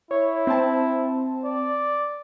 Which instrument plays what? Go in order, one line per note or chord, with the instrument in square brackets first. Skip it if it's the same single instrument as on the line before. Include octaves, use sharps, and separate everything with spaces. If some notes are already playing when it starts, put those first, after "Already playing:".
[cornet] E4 [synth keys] C#5
[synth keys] C4 A5
[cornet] D5